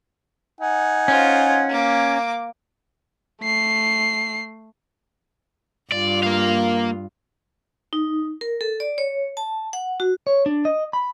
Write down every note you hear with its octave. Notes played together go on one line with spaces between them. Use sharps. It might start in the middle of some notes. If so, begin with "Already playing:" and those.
D#4 F#5 G#5
C#4 F4 C5
A#3 D6
A3 C7
G2 F4 D5
A#3 F5
D#4
A#4
A4
D5
C#5
A5
F#5
F#4
C#5
D4
D#5
B5